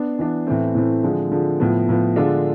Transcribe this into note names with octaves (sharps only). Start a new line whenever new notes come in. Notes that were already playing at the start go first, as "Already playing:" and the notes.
Already playing: B3 D4
E3 B3 D4
A2 E3 A3 C4
A2 E3 A3 C4
D3 F3 G#3
D3 F3 G#3
A2 F3 B3
A2 F3 B3
D3 G#3 D4 F4 A4